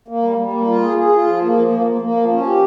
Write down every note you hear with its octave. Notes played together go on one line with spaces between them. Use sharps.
A#3
G3
G3
A#3
F4
G#4
G#4
F4
F3
A#3
F3
A#3
A#3
A#3
F3
C#4
G4